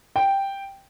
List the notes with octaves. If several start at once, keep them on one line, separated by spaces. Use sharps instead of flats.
G5